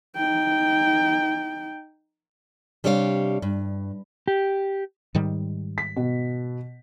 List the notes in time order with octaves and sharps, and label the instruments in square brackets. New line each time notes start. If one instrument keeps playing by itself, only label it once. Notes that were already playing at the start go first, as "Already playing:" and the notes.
[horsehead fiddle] D#4 G5
[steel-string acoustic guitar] C3 G3 D4 C#5 D5 F5
G2
[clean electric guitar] G4
[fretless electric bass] G#2 D#3 G3
[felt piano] B6
B2